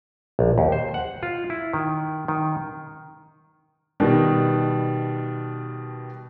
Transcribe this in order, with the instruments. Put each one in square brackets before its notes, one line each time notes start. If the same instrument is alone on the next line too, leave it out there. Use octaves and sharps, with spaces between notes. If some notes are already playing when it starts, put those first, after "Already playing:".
[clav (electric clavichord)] A#1
D#2
C5
F#5
F4
E4
D#3
D#3
[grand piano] B2 D#3 G3